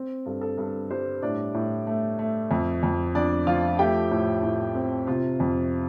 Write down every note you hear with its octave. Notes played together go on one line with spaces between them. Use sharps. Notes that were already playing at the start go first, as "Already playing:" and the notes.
Already playing: C4
G2 A4
A4
G2 A4
G3 C5
A2 D4 D5
A2
A3
A3
F2
F2
F2 D4 D5
F3 F4 F5
A3 G4 G5
A2
A2
C4
C3 F4 F5
F2